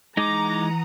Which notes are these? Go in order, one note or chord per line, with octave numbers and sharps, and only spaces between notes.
E3 G#3 D#4 F#5 A#5 D6 D#6